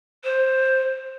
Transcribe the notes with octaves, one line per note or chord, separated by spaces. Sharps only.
C5